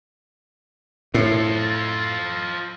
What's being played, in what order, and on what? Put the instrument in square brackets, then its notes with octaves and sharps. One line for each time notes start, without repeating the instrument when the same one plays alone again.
[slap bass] A2 [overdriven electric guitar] F4 A4